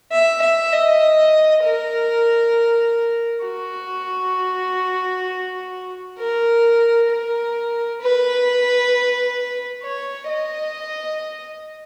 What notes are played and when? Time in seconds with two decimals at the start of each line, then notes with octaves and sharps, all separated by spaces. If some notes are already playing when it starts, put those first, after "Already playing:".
0.11 E5
0.41 E5
0.72 D#5
1.63 A#4
3.45 F#4
6.19 A#4
7.10 A#4
8.01 B4
9.83 C#5
10.28 D#5